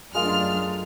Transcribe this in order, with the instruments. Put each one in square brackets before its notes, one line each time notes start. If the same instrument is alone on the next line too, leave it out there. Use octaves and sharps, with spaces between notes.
[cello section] F#2 A3 D4 [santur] G#3 F4 A#4 [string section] F6